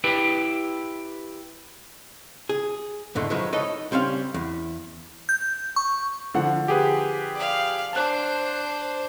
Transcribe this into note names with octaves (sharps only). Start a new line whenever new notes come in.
E4 G4 B4
G#4
E2 G#2 D3 A3
D#3 F3 F#3 G#3 A3 B3
D#4 A4 B4 C#5 D#5
C#2 G3 C4 C#4 F5
E2
G6
C#6
D3 F3 F#5
G4 G#4 B4
D5 F5
D4 C5 A5 F#6